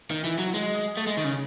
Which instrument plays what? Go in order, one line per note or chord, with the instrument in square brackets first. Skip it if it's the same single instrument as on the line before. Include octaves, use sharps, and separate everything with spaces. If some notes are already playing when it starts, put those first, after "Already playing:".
[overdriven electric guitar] D#3
E3
F#3
G#3
A3
G#3
D#3
C#3